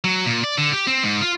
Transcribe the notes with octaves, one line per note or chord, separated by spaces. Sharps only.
F#3
A#2
D5
D3
G4
C4
G#2
F4